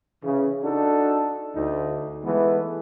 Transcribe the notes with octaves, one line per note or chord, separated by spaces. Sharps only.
C#3 E3
D4 D#4 F#4 A4
D2 D#4
E3 G#3 A3 B3